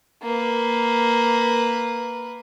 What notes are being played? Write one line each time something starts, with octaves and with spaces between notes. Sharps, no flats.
A#3 B4